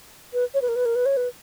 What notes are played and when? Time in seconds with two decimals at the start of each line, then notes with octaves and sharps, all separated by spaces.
0.33 B4
0.54 C#5
0.62 B4
0.68 A#4
0.76 B4
0.85 A#4
0.96 B4
1.06 C#5
1.17 B4